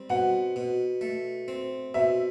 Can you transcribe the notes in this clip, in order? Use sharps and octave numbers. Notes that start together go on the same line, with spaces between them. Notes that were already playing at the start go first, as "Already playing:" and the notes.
Already playing: G3 C4
B2 F#5
B2
A3
C4
B2 E5